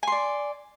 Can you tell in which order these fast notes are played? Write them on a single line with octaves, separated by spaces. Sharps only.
G#5 C6 D5